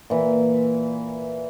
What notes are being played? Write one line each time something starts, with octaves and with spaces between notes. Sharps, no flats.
A#2 E3